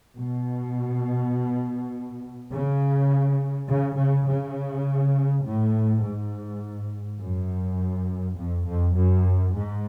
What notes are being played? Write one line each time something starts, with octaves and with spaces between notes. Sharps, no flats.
B2
C#3
C#3
C#3
C#3
A2
G#2
F#2
F2
F2
F#2
G#2